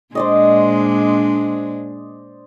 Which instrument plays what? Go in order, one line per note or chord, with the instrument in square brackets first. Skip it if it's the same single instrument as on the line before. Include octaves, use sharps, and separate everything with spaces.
[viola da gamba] A#2 G#3 D4 [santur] C5 D5 D#5